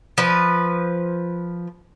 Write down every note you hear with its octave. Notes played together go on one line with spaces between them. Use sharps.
F3 B4